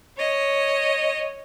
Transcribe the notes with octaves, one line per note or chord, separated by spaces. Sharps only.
C#5 D#5